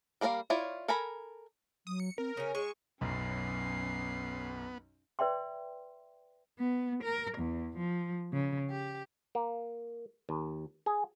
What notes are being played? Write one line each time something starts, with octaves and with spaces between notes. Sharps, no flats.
G3 A#3 A#4 D5 F5
E4 F4 C#5 D5
A4 A#4 G#5 A#5 B5
F#3 D#6
C#7
C4 A#4
C#3 C#4 C#5
G#3 C#6
B1 F#2 B3 C#4 C7
B4 D5 E5 G5 C6
B3
A#4
E2
F3
C#3
G4
A#3
D#2
G#4